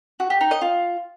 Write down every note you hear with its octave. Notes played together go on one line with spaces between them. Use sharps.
F#4
G4
D#4
D#5
F4